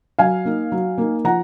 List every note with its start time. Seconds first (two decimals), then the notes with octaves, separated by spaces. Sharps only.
0.19 F#3 F5 G#5
0.45 A#3 D#4
0.72 F#3
0.98 A#3 D#4
1.24 F3 F#5 A#5